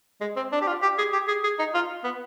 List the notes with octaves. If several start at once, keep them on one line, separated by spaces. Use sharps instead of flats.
G#3
C4
D4
G4
F4
G4
G#4
G4
G#4
G#4
D#4
F4
B3